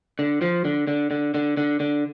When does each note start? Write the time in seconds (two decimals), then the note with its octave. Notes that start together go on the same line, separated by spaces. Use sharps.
0.19 D3
0.42 F3
0.65 D3
0.87 D3
1.11 D3
1.34 D3
1.57 D3
1.80 D3